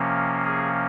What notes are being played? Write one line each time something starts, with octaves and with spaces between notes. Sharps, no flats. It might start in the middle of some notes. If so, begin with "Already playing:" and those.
Already playing: C3 F3 A#3 C#4
G#4